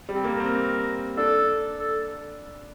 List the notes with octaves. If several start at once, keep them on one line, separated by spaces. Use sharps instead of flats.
G3 C4
A#3
A#4
C4
D4 A4
A4